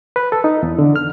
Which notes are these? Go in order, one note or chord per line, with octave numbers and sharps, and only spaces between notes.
B4
A4
D#4
E2
D3
F6